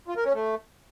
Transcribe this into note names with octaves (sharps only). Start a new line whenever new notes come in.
F4
A#4
C#4
A3